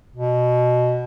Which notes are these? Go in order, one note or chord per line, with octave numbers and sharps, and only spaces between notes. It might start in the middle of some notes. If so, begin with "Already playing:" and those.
B2